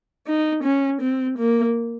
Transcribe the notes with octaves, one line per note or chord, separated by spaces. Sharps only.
D#4
C#4
C4
A#3